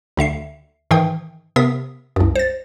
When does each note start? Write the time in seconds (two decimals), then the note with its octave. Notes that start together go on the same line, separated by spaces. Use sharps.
0.17 D2 D3 E5 C7
0.91 G#2 D#3 E3 G5 D#6 G6
1.56 C3 B3 A#4 D#6 B6
2.16 C2 F#2
2.35 C5 A6